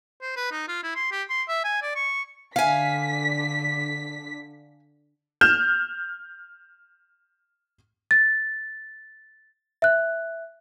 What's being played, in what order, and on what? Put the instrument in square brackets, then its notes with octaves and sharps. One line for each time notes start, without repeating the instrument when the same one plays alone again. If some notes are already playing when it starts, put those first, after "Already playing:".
[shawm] C5
B4
D#4
F4
E4
C6
G4
C6
E5
G#5
D5
C#6
[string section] D3 B6 [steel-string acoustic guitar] F5 G#5
[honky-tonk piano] F6 G6 E7
[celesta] A6
E5 F#6